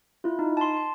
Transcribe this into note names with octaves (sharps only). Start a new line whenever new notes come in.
E4 F4
D#4
A5 C6
C6